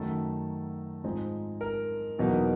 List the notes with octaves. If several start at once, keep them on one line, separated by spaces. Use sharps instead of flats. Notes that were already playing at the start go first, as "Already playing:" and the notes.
Already playing: F#2 D#3 F#3 A3 A4
G#2 F3 G#3 C4 D#4
A#4
E2 B2 F#3 A#3 D#4